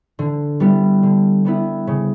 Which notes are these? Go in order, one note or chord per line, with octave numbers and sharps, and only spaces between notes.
D3
G3 B3 E4
D3
G3 B3 E4
C#3